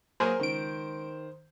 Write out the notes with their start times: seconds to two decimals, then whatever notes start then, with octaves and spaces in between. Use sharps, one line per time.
0.20 F#3 A#3 G#4 A#4 C5 G#5
0.40 C#2 D#3 D7